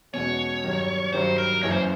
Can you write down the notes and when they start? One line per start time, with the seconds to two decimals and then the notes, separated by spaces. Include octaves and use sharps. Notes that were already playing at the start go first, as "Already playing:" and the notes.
0.13 E2 B2 G#3 C#4 F#4 C#5
0.64 G2 D#3 F#3
1.13 G2 D#3 F#3 C5
1.38 A#4
1.63 F#1 F#2 C#3 E3 C#5
1.72 C5